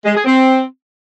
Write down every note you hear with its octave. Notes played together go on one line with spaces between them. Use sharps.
G#3
G#4
C4